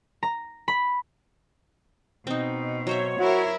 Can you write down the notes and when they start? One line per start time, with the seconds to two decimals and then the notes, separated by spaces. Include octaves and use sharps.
0.23 A#5
0.68 B5
2.27 B2 C4 D#4
2.87 F#3 C5 C#5 E5
3.18 E4 F#4 A#4